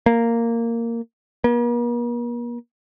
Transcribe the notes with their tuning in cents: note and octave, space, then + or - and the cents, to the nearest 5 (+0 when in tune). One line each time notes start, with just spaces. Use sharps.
A#3 -10
A#3 +45